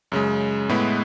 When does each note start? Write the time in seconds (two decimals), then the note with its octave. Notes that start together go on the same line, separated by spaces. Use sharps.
0.12 F#2 C#3 G#3
0.69 A2 G#3 B3 E4 B4